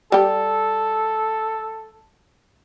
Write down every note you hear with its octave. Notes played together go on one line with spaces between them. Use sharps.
G3 G4 A4